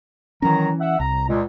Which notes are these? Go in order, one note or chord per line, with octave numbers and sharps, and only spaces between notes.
D#3 E3 F#3 C#4 A#5
E5 F#5
C2 A#5
C#2 A#2